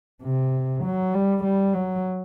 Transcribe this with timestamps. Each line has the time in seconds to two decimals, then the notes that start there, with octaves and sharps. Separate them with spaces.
0.23 C3
0.84 F#3
1.14 G3
1.44 G3
1.74 F#3